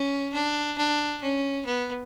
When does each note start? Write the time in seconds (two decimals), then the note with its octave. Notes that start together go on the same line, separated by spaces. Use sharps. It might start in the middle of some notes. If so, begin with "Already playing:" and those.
Already playing: C#4
0.33 D4
0.77 D4
1.22 C#4
1.66 B3